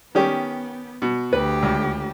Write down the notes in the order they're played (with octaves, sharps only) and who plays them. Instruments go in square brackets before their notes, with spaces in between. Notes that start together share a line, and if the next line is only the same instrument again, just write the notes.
[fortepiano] D#3 C#4 G4 [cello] B3
[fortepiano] B2
[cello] D2 G4 [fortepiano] B4
[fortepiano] C#2